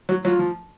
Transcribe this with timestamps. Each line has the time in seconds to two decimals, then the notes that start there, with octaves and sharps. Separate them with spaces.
0.09 F#3 F#4
0.24 F#3 F4
0.39 F3